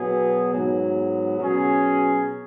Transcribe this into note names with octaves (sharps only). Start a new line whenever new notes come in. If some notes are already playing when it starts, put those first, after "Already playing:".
Already playing: B2 F#3 B3 G#4
G#2 F#3 B3
B2 F#3 C#4 G#4